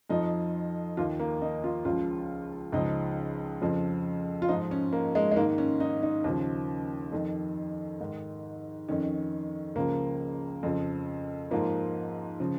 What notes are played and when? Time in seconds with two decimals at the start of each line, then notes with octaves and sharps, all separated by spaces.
0.10 F2 F3 D#4
0.97 D#2 D#3 F4
1.20 A#3
1.42 D#4
1.64 F4
1.85 C#2 C#3 F3 F4
2.72 C#2 C#3 F3 D#4
3.61 F2 C#3 F3
4.42 F4
4.49 G#2 F3 D#4
4.71 C#4
4.93 A#3
5.15 G#3
5.31 G#3
5.36 G#2 A#3
5.40 D#3
5.58 C#4
5.80 D#4
6.03 D#4
6.24 D#2 C#3 F3
7.12 F2 D#3
8.00 G#2 D#3
8.89 F2 D#3 C#4
9.75 C#2 C#3 F3 A#3
10.63 F2 C#3 F3
11.51 G#2 F3 A#3
12.40 C#3 F3